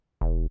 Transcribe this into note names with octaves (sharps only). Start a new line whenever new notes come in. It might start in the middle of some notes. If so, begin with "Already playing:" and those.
E1